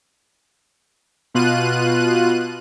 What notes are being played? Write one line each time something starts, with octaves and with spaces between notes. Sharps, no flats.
B2 F4 F#6 D#7